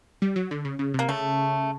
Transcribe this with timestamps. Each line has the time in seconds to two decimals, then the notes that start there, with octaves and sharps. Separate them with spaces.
0.22 G3
0.36 F#3
0.51 D3
0.65 C#3
0.79 C#3
0.94 C3
0.99 A#3
1.08 C#3 A3